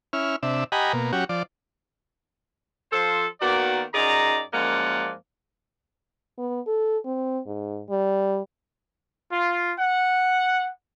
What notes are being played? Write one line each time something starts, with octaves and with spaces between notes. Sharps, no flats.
C#4 E4 F6
C3 D4 E5
G4 D#5 F#5 G#5 A#5 B5
B2 A#3
F#3 C#4 F#4 G4
F3 D5
F3 A4 C5
D#3 A#3 B3 F#4 D5
F#2 D#4 G#4 D5 A#5
F#2 F3 G#3 A#3 D5 F#5
B3
A4
C4
G#2
G3
F4
F#5